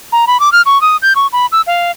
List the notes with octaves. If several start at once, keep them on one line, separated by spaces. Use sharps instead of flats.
A#5
B5
D6
F6
C#6
D#6
G6
C#6
B5
E6
F5